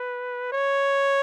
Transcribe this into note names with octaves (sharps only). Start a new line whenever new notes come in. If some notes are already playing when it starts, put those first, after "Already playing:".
Already playing: B4
C#5